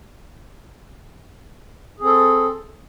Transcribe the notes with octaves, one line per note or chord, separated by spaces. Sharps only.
C4 G#4 A4